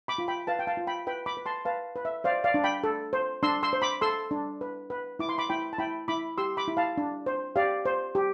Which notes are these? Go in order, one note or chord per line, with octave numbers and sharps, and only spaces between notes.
B5 D6
F4
G5 B5
B4 F5 A5
G5
F5 A5
F4
G5 B5
B4 G5 B5
B5 D6
B4
A5 C6
B4 F5 A5
B4
E5
C5 D5 F5
D5 F5
D4
G5 B5
A4
C5
D4 C6 E6
C6 E6
C5
B5 D6
A4 C6 E6
D4
B4
B4
E4 D6
C6
B5 D6
E4 G5 B5
A5
E4 G5 B5
E4 B5 D6
G4 C6 E6
B5 D6
E4
F5 A5
D4
C5
G4 D5 F5
C5
G4